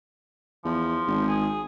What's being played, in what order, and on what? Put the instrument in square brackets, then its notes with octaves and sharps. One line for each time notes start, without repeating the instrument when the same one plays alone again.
[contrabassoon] E2 [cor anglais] F3
[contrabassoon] G#1
[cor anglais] G#4